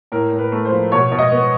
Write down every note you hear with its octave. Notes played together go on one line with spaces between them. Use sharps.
A2 A#4
A2
B4
A3
C5
F3
B2 C#5
B2
D#5
B3